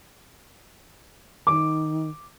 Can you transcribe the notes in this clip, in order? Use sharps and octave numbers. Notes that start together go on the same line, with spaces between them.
D#3 D6